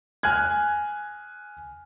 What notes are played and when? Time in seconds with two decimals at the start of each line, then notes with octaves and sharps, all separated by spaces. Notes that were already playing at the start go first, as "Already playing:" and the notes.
0.23 G#5 F6 F#6 G#6